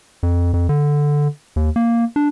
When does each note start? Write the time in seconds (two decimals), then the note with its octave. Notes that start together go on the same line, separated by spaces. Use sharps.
0.23 F2
0.54 F2
0.69 D3
1.56 D#2
1.76 A#3
2.16 D4